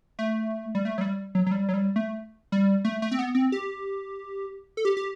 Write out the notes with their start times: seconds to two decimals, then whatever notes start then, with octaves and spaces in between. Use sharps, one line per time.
0.19 A3
0.75 G3
0.85 A3
0.98 F#3
1.01 G3
1.35 F#3
1.47 F#3
1.52 G3
1.69 F#3
1.74 G3
1.96 A3
2.52 G3
2.85 A3
3.02 A3
3.11 C4
3.19 B3
3.35 C4
3.52 G4
4.77 A4
4.85 G4
4.97 G4